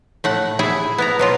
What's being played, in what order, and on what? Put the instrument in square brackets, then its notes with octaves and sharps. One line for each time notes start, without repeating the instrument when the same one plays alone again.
[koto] A2 A3 F#5
E4 G#4 A4 E5
B3 E4 A#5
B2 F#3 F4